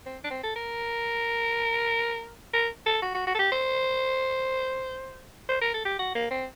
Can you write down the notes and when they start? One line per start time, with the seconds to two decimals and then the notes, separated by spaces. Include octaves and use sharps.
0.06 C4
0.24 D4
0.31 C4
0.43 A4
0.56 A#4
2.53 A#4
2.86 A4
3.02 F#4
3.14 F#4
3.27 F#4
3.35 A4
3.39 G4
3.52 C5
5.49 C5
5.61 A#4
5.74 A4
5.85 G4
5.99 F#4
6.15 A#3
6.31 C4